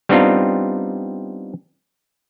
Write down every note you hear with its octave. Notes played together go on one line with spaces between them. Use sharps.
G3 B3 C4 D4 D#4 F4